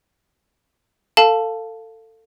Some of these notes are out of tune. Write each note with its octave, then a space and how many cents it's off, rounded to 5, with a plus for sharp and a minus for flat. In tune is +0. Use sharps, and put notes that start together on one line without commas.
A4 +25 F5 +0 A5 +0